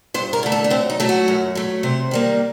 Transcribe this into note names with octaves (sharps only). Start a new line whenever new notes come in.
G2 C5
A#4
D3 A3
A4
D4
F#2 C4
D#4
F#3 A3
F#4
F#2
F#3 A3
C3 C5
D#3 G3 A#3